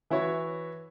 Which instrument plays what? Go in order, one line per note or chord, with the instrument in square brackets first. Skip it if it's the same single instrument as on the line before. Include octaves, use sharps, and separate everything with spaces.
[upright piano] E3 E4 F#4 C#5